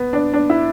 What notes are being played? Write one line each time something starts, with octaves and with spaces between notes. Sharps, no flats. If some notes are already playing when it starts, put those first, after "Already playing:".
Already playing: B3
D4
D4
E4